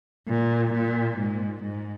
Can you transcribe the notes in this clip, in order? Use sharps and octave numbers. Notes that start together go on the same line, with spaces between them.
A#2
A#2
G#2
G#2